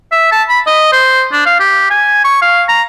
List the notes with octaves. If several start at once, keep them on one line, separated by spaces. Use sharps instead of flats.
E5
A5
B5
D#5
C5
D4
F5
G4
G#5
C#6
F5
A#5